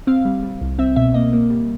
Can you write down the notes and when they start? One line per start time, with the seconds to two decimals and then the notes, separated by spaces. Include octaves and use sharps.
0.07 C4 F5
0.25 G3
0.43 G3
0.61 C2
0.79 C4 E5
0.96 B2 E5
1.14 A#3 D#5
1.33 A#3
1.50 G3